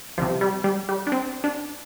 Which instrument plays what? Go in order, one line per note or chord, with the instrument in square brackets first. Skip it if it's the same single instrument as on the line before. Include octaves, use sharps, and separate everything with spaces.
[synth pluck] C2 C3 F3
G3
G3
G3
D4
C4
D4